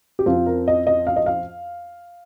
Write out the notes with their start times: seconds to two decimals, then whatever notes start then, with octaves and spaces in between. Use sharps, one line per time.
0.19 G4
0.26 F2 F3 C4 F4
0.46 A#4
0.68 D#5
0.87 D#5
1.07 F5
1.16 D#5
1.26 F5